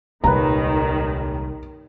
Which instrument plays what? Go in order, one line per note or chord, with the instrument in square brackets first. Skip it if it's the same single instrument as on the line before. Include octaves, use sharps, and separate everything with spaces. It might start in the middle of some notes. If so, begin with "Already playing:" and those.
[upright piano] D#1 B4 [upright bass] C2 G#3 [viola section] D#3 [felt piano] A#5